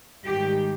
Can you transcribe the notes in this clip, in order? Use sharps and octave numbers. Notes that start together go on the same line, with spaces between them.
G#2 D#3 G3 G4